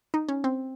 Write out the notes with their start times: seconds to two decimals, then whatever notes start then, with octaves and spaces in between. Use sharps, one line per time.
0.14 D#4
0.29 C#4
0.44 C4